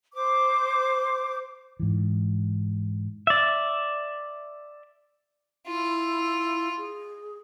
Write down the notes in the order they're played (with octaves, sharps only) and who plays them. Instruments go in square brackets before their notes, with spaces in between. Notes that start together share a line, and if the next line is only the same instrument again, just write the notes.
[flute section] C5 D6
[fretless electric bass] G#2 E3
[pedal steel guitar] D5 E5
[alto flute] E4 [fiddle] F4
[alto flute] G#4